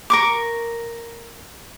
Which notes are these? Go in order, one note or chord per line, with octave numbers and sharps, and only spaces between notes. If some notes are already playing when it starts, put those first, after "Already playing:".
A#4 C#6 D6